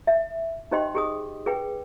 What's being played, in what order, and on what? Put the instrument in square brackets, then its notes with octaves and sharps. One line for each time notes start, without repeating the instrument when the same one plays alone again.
[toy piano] E5
D#4 G4 C5 D#5 G5 C6
G4 G#4 D#6
G#4 B4 G5